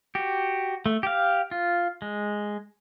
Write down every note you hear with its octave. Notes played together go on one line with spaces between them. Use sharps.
F#4 G4
A3
G4 F5
F4
G#3